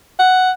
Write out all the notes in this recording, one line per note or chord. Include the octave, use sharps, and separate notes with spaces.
F#5